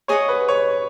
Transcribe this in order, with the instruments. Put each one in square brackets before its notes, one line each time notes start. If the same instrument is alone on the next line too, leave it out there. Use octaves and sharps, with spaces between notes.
[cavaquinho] G#4 D#5 F#5 C#6 [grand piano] C#5
[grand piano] B4
C#5